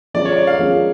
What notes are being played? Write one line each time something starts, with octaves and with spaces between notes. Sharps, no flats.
F3 G#3 C#4 D5
C#5
D5
F5
F3 G#3 C#4